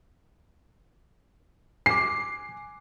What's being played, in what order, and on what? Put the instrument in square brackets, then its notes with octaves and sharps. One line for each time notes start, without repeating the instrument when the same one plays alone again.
[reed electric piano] G#5 D6 [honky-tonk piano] C7